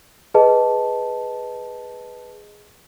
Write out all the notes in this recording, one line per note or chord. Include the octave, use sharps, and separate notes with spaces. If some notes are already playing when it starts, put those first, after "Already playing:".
G#4 B4 D#5 A5